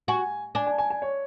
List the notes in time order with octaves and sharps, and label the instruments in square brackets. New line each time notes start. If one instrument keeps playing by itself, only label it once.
[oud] F#4 [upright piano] G#5
[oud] D4 [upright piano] G#5
[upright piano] G#5
G#5
G#5
C#5